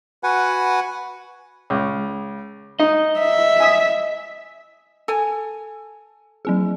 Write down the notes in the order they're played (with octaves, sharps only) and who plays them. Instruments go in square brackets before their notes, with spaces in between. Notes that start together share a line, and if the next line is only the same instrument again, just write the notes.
[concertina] F#4 B4 F#5 G#5
[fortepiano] C#2
[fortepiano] D#4 [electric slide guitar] D#5
[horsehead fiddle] E5
[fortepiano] G#5 D#6
[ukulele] A4 G#5
[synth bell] F#3 C4 G#4